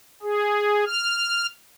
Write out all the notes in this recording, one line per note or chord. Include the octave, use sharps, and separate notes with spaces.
G#4
F6